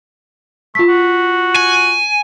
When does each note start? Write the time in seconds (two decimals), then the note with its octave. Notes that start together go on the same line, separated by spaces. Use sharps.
0.75 A3 F4 B6
0.88 F#4
1.56 G#5